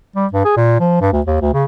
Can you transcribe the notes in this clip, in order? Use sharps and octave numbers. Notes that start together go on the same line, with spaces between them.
G3
G2
G#4
A#2
F3
G2
D2
D#2
D2
C#3